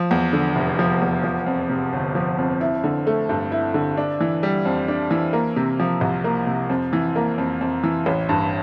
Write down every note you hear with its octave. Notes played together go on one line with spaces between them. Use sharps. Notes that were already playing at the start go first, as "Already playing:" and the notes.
Already playing: F3
E2
D3
F1
F3
E2
F3
F2
C3
G1
F3
F2
E4
D3
A3
G2
E4
D3
D4
E3
G3
F2
D4
E3
A#3
C3
F3
C2
A#3
C3
F2
E3
A#3
F2
F2
E3
A1
G2